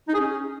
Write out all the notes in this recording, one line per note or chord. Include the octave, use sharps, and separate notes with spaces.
D#4
G#4
C#4